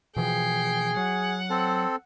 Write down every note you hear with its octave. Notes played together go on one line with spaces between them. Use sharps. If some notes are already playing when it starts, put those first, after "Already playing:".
B2 E3 F3 G#4 G5 C7
F#3 F#5
C4 A4